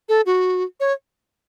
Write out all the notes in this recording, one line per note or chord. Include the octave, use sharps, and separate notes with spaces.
A4
F#4
C#5